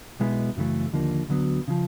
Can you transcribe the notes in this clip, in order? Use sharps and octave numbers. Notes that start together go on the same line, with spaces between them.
B1 B2 G#3 B3 E4
F#2 C#3 E3 A3
D#2 D3 F3 A#3
D2 D3 F#3 B3
C#3 F3